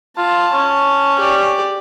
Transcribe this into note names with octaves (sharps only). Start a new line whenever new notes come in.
F4 A5
C#4
G4 D5